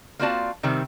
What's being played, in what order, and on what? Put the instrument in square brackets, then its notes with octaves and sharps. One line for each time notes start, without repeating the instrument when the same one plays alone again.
[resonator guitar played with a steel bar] A#3 C4 F4 F#4 D5 A5
C3 D#3 G3 C4